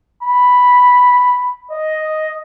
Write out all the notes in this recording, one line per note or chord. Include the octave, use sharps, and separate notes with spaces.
B5
D#5